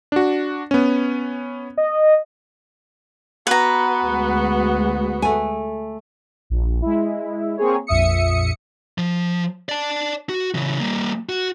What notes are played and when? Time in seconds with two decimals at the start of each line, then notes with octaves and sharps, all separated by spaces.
0.12 D4 F#4
0.71 B3 C#4
1.77 D#5
3.47 B3 F#4 B4 A#5
4.03 D2 G#3
5.22 A3 G#5
6.50 A#1
6.82 G#3 E4
7.57 A#3 C4 G#4 C#5
7.87 A#1 F2 E5 D#6 C#7
8.98 F3
9.69 D5 A5
10.29 F#4
10.55 C#3 E3
10.80 G3 A#3
11.29 F#4